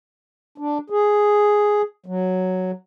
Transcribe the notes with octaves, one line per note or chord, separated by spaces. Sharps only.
D4
G#4
F#3